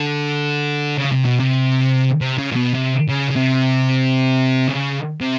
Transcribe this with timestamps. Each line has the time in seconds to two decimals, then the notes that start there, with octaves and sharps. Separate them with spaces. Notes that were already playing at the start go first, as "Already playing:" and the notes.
Already playing: D3
0.98 C#3
1.12 C3
1.25 B2
1.39 C3
2.21 C3
2.38 C#3
2.52 A#2
2.56 B2
2.75 C3
3.09 C#3
3.30 C#3
3.36 C3
4.68 C#3
5.21 C3